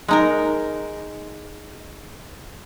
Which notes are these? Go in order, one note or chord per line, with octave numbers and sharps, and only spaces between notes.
G#3 D#4 A#4